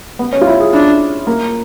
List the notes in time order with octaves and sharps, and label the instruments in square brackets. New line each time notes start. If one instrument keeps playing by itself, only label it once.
[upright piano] B3
C#4
F4
E4
G#4
[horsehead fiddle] D4 [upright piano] E4
[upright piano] A#3